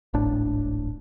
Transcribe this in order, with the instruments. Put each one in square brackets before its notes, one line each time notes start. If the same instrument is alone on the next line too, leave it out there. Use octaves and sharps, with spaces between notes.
[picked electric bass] D1 G#1 A2 D4